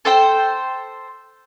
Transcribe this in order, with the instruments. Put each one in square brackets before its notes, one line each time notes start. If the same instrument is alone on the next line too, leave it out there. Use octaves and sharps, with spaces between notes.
[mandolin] A4 C5 G5